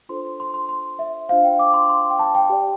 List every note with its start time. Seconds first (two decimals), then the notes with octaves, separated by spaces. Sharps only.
0.09 D4 F4 A4 C5 C6
0.40 C6
0.54 C6
0.69 C6
0.99 E5
1.29 D4 F4 C5 F5
1.44 G5
1.59 D6
1.74 C6
1.89 C6
2.10 G5
2.19 A5
2.35 G5
2.49 G4 D5